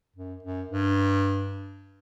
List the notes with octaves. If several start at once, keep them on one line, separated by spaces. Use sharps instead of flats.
F#2
F#2
G2